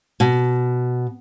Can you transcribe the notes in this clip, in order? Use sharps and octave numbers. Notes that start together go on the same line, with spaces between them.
B2